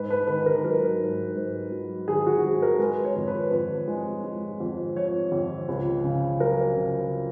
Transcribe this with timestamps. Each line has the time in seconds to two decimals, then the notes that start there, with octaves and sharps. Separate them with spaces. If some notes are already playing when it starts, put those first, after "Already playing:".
Already playing: G#2 B4
0.10 B4
0.27 D#3 B4
0.46 A#4
0.64 F#3 A#4
1.00 G#2
1.35 G#2
1.71 F#3
2.08 D#3 G#4
2.26 F#4
2.43 G#2 G#4
2.62 A#4
2.79 G#3 B4
3.04 C#5
3.16 F2
3.28 B4
3.51 F2 B4
3.88 G#3
4.24 G#3
4.60 F2
4.96 F3 C#5
5.32 F2
5.68 C#2
6.04 C#3
6.39 F#3 A#4
6.76 C#3